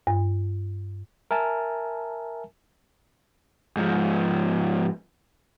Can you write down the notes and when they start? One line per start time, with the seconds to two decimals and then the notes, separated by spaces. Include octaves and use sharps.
0.07 G2
1.31 A#4 E5 G#5 A5
3.77 G#2 F3